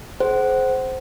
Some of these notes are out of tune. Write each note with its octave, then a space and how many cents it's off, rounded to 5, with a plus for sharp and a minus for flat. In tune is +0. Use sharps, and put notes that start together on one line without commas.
G#4 +45 C5 +0 F#5 +25